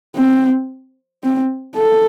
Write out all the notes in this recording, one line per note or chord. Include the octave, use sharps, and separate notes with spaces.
C4
C4
A4